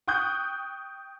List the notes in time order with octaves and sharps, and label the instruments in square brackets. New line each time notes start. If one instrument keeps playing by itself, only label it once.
[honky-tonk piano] G5 C#6 D#6 F#6 G6